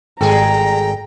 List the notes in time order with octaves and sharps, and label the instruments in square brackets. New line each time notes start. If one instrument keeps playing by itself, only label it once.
[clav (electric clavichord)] G#1 [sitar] G3 G#4 A4 [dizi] G5 [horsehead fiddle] A#5